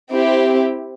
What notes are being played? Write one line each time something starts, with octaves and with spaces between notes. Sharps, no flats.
C4 E4 G4